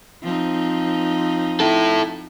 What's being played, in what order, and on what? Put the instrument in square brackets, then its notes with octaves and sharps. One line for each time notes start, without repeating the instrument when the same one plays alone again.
[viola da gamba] F3 C4 D#4
[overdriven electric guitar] E4 A4